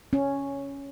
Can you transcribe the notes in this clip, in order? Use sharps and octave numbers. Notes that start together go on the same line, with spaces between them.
C#4